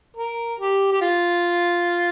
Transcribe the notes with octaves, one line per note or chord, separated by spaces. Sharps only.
A#4
G4
G4
F4